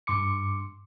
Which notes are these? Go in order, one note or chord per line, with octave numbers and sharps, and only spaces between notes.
G2 C6 D6 C#7